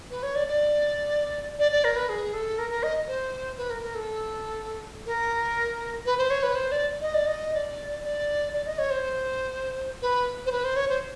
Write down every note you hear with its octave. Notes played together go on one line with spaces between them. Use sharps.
B4
C#5
D5
D5
D5
D5
A#4
B4
G#4
A4
A#4
A#4
D#5
C5
B4
A#4
A#4
A4
A#4
B4
C5
C#5
B4
C5
D5
D#5
D5
D#5
D5
D5
D5
D#5
C#5
C5
B4
C5
B4
C5
C#5
C5